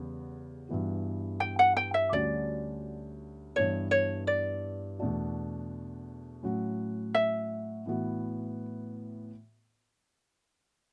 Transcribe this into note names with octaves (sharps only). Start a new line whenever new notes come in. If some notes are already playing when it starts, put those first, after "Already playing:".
Already playing: E2 C#3 G3 B3
G2 E3 B3 F#4
G5
F#5
G5
E5
D2 D3 G3 C#4 F#4 D5
G2 E3 B3 D4 C#5
C#5
D5
E2 B2 A3 D4 F#4
A2 F#3 C#4 F#4
E5
A2 E3 B3 F#4